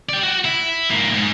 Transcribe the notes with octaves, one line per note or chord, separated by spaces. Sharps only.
D5 G5
F#4
E4
G#2 A#3
G#2